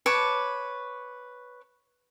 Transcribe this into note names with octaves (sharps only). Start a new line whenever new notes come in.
B4 C#5 A5 D6